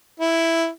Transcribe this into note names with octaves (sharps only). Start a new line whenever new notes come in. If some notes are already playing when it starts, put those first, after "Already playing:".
E4